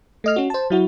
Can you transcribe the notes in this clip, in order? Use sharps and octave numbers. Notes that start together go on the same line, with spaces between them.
A3 D#5 F6
C#4 F#4
C5 A5
F#3 E4 F#4